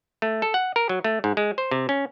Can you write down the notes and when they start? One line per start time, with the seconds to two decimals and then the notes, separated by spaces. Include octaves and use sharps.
0.22 A3
0.42 A4
0.54 F#5
0.76 A#4
0.89 F#3
1.04 A3
1.24 G#2
1.37 G#3
1.58 C5
1.71 C3
1.89 C#4